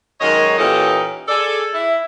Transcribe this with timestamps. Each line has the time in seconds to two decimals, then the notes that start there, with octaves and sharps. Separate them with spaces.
0.21 F#2 D#3 G#3 C#5 D#5
0.58 A#2 E3 C#4 D#4 G4 A4
1.28 G#4 A4 D5
1.74 E4